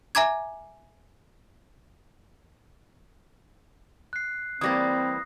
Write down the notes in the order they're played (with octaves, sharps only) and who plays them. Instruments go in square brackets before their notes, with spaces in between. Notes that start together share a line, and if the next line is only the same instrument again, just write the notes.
[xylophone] E5 G#5 A#5 D6 G#6
[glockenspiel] F#6 C7
[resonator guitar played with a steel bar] E3 G3 A#3 [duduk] C4 [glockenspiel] D#6 A#6